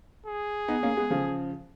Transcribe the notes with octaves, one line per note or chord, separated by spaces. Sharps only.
G#4
B3 D#4
A#3 C#4
G#3 B3
C#3 F3